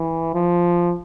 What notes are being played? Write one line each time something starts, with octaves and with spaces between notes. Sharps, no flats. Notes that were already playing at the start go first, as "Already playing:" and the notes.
Already playing: E3
F3